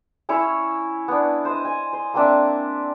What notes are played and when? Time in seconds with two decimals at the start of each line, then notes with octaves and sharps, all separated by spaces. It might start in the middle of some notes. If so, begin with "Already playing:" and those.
0.29 C#4 E4 C#5 E6
1.08 B3 D4
1.45 C5 D#5
1.65 G#5
1.93 C5
2.14 A#3 C4 D4 E5